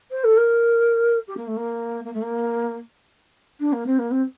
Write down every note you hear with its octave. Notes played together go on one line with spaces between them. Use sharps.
C5
A4
A#4
G4
A#3
A3
A#3
A#3
A3
A#3
D4
A#3
C4
A#3
C4